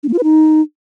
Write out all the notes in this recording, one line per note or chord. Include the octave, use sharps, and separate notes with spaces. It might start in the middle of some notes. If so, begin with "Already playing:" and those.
D4
A#3
F4
B4
D#4